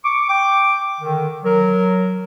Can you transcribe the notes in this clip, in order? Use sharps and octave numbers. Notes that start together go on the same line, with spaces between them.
C#6 D6
G5 D6
D3 D#3
F#3 A#4